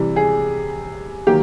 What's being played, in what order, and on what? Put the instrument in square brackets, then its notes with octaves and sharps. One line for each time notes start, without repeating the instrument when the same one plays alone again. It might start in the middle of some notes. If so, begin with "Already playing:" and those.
Already playing: [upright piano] C3 E3 G3
G#4
D#3 F#3 A#3 G4